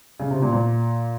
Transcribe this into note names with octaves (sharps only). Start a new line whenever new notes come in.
C#3
C3
A#2
A#2